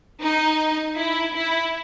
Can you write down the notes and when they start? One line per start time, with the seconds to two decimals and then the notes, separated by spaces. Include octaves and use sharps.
0.21 D#4
0.96 E4
1.34 E4